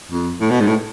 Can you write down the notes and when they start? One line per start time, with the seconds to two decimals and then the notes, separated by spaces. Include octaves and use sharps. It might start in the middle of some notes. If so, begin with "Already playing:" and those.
0.11 F2
0.41 A2
0.50 B2
0.60 G#2
0.67 A2